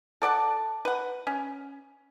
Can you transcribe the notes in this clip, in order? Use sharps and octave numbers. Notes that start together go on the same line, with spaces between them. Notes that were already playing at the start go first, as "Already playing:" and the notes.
A4 D5 F#5 A5
B4 F#5
C#4